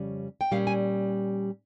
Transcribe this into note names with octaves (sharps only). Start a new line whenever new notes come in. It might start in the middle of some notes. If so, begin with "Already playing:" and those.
Already playing: F2 C#3 G3 C#4
G5
A#2 G3 C#4 F5
G#5